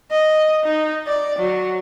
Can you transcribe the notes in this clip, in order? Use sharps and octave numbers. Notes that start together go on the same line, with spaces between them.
D#5
D#4
D5
F#3